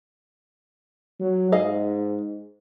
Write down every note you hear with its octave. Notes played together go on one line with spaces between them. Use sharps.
F#3
G#2 G#4 D#5 F5